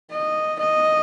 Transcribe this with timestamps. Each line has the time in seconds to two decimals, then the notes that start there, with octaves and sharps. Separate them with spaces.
0.12 D#5
0.60 D#5